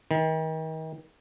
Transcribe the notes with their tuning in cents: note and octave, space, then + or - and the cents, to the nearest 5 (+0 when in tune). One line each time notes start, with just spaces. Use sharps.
D#3 +40